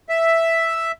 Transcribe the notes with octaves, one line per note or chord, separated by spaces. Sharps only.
E5